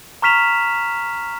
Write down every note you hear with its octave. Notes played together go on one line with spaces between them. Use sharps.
A#5 C#6 F6 B6 E7 F7